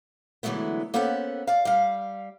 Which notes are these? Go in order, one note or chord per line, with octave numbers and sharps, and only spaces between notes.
D3 E3 F#3 G#3 A3 B3
A#3 B3 C#4 A4 C5 F#5
D5 F5
G3 F5